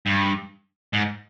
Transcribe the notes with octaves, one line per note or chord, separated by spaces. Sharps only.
G2
G#2